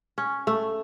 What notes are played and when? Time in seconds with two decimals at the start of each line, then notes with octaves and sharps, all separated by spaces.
0.18 C#4
0.47 A3